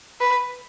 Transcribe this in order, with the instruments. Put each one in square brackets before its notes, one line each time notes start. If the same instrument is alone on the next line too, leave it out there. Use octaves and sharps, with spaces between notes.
[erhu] B4